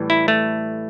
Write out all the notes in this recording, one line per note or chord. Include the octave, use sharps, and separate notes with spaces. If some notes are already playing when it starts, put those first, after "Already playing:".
Already playing: A2 E3 G3
E4
A3